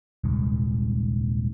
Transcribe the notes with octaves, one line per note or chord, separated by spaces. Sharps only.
D#1 C2 G#2